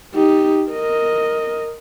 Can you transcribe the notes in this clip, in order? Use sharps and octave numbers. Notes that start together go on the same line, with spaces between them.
D#4 G4
A#4 D#5